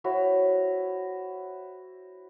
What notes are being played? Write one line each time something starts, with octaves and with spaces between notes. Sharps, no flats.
E4 F#4 C5 C#5